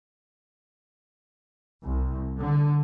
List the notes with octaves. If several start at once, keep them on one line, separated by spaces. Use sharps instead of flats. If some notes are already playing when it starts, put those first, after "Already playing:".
C2
D3